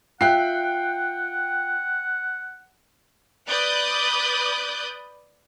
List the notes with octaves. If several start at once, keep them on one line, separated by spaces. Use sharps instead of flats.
F4 E5 F#5 G5 F#6 C7
B4 D5 D#6 F#6 G6